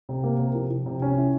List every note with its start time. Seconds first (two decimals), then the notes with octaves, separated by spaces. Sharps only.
0.09 C3
0.23 A#3
0.39 C3
0.55 F3
0.70 F3
0.86 C3
1.02 C#4
1.18 E4